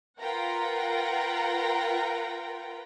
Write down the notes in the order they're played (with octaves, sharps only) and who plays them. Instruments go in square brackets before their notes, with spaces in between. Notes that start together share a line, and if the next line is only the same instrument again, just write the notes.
[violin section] F4 A#4 B4 F#5 G5 A#5